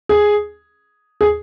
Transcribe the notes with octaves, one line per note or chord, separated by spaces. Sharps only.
G#4
G#4